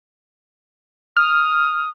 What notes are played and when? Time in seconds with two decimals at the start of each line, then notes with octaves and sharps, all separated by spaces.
1.17 D#6 F6